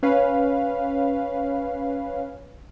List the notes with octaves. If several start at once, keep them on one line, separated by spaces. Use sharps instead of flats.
C#4 B4 F5